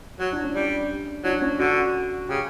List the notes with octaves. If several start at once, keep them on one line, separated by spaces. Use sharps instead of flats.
F#3 C#5
D4
C#4
G3 D4
F#3 D4
C#4
D3 F#4
C#3 G4